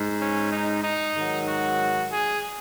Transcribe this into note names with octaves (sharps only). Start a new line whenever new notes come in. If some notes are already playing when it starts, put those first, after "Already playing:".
Already playing: G#2 G#3
C#4
D#4
D#4
G#2 D#3 F#3
F#4
G#4